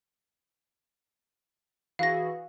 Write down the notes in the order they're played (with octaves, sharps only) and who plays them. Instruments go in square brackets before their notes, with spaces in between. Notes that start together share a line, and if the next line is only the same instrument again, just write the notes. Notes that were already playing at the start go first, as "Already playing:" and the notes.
[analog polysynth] E3 F#4 G#4 [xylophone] F5 A#6